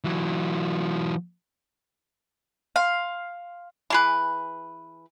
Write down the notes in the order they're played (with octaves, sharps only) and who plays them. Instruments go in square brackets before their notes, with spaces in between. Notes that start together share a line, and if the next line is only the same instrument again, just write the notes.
[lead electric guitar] E3 F#3
[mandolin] F5 C6
[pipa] E3 G#4 B4